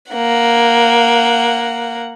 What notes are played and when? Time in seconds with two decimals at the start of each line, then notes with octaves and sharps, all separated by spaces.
0.12 A#3 F#5